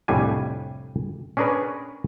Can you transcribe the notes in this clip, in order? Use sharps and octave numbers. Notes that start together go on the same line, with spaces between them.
C2 F2 A2 G3 D4 G#5
C#4 D4 G#4 A#4 B4 C#5